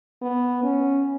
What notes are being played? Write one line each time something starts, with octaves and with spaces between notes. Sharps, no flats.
B3
C#4